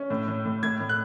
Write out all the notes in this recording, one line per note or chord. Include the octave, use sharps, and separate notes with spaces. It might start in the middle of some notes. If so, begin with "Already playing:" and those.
Already playing: C#4
A2
A2
A2
A2 G#6
A2
F#6